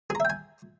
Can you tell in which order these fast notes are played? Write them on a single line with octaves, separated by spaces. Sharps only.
G#4 A#5 E5 G5 G#5